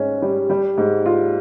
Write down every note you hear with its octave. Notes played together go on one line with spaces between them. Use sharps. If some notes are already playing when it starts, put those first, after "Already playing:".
Already playing: G#2 C#4
G3
G3
G#2
F4